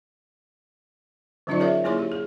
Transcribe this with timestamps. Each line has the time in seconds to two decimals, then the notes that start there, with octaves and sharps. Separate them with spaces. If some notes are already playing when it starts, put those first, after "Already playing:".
1.47 D3 F#3 C#4 D#4 F4 D5
1.60 G#4 A#4 C#5 D5 E5
1.84 A#3 E4 G#4 C#5 C6
1.99 G4
2.12 G#4